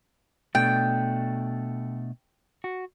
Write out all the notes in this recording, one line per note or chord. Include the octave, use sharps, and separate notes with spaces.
B2 A3 D4 G5
F#4